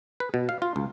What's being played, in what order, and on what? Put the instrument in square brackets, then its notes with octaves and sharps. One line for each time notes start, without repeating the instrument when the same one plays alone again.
[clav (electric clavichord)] B4
B2
F5
F4
C#2